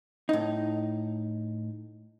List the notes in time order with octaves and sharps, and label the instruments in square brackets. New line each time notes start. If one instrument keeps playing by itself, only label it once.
[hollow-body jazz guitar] A2 D#4